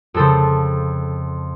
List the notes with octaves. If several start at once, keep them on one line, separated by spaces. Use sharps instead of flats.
F2 C#3 F3 A4 C5